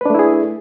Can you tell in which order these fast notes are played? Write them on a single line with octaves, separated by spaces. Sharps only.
B4 D4 A3 E4 G#4